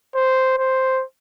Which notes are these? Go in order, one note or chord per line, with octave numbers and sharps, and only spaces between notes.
C5
C5